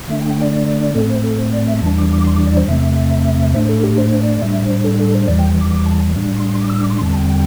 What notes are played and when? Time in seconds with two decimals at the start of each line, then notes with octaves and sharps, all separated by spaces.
0.08 D3 A3 D4 E5
0.20 G5
0.30 G5
0.41 D5
0.95 A2 A3 C4 A4
1.10 C5
1.23 A4
1.38 C5
1.53 D5
1.67 E5
1.81 E2 E3 G3 D4 A5
1.97 D6
2.10 D6
2.24 C6
2.36 D6
2.47 D5
2.57 C5
2.68 E2 C3 A3 C4 E5
3.54 A2 A3 D4 C5
3.69 A4
3.83 G4
3.98 C5
4.20 D5
4.42 A2 G3 D4 E5
4.63 C5
4.84 A4
5.00 A4
5.14 C5
5.28 E2 E3 G3 D5
5.39 G5
5.61 D6
5.71 D6
5.86 A5
6.15 A2 G3 D4
6.36 C6
6.58 D6
6.70 E6
6.80 D6
6.90 C6
7.01 E2 D3 G3 C4 A5
7.17 G5
7.30 G5